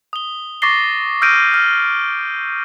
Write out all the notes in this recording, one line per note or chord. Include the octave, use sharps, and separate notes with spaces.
D#6 G7
C#6 D6 A6 A#6 C7 G7
E6 F6 G6 A#6 D7 D#7
F6